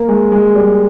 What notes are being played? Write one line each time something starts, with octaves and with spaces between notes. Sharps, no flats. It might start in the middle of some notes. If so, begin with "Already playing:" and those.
Already playing: A#3
G#3
G#3
G3